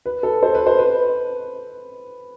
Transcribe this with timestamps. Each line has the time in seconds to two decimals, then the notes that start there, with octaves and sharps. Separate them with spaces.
0.06 B4
0.23 A4
0.43 C5
0.55 B4
0.66 C5
0.79 B4